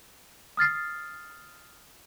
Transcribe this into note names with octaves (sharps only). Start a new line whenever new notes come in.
D#6 F6 A6 C7